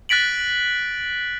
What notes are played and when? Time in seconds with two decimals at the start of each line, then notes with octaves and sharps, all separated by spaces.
0.09 F#6 A6 B6 D7 F#7